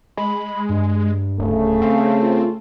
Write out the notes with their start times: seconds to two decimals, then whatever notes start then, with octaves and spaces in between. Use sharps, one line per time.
0.17 G#3 B5
0.69 G2
1.39 D1 C#3 A3
1.82 C4 F5
2.22 F4